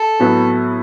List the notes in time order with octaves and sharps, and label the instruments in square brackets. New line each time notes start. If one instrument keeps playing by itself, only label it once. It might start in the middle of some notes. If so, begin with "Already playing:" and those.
Already playing: [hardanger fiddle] A4
[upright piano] A2 F#3 B3